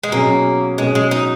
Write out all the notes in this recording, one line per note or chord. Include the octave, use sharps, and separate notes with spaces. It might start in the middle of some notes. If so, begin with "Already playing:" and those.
G#3
B2 F#3 A#3 C#4 G#4
B2 F#3 G#3 C#4 G#4
G#3
D#4